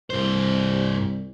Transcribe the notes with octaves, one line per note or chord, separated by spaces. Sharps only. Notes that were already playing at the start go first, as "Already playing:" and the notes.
C2 G2 C5